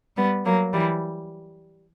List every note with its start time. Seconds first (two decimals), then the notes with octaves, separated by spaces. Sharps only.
0.17 G3 B3
0.45 F#3 A#3
0.73 E3 G3